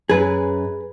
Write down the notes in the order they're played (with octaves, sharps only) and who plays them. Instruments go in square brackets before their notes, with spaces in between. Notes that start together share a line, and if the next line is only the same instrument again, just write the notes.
[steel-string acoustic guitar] F#2 [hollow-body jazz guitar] G#4 B4